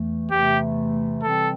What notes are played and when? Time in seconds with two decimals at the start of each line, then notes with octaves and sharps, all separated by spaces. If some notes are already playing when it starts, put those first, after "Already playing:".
Already playing: E2 E3 A3
0.31 E2 C3 E3 A3 G4
1.23 C3 E3 G3 C4 A4